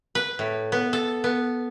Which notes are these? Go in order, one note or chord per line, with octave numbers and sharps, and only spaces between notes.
B4
A2
B3
A4
B3